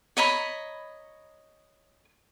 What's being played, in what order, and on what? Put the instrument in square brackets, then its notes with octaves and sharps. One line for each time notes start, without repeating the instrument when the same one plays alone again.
[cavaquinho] C#5 D#5 A#5 B5